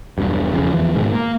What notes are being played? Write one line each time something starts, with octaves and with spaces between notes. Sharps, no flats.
E1 B1 G2
E1 F2 C#3
E2 E3 F3
G#2 B2 D#3 G#3
A#3